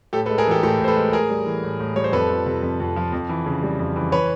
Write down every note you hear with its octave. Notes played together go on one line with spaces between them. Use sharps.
A2 G4 A4
A4 B4
G#3
G#4 A#4
E3 G4 A4
A2 G4 A4
A2 C5
A4 B4
G#3
A2 G#4 A#4
G3
E3
A2
A2
G3 C#5
C5
F2 A4 B4
F3
C3
F2
F2
F3
F2
E3
C#3
G3
F2
E3
B4 C#5